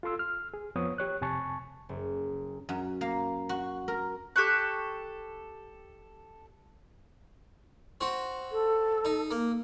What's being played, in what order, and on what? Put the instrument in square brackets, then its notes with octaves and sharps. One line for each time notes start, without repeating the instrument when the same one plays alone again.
[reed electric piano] F4 A4 C6 E6
F6
G#4
F2 F3 B3 C#5 D#6
G4 C#5 F#6
F2 C3 G#5 A5 C#6
[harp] F#1
[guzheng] F#2
A#3
F#4
A#4
[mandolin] G4 A4 C#6 F#6
[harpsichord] C4 F#4
[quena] A4
[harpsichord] D#4
A#3